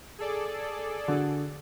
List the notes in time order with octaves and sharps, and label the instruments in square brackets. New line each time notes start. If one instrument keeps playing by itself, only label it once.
[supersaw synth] G#4 A4 D5
[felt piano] D3 F#4